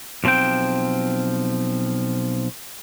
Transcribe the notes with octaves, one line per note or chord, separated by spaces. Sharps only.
B1 C3 F3 C4 G5